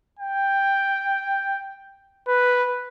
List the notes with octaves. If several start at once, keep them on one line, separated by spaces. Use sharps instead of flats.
G5
B4